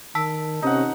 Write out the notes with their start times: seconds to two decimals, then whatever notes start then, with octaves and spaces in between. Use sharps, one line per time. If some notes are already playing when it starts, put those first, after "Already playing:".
0.15 D#3 A5 E6 B6
0.62 C3 C#4 D#4 F#5